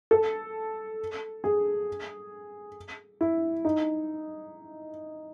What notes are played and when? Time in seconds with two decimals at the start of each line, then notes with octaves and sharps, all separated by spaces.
0.11 A4
1.44 G#4
3.21 E4
3.65 D#4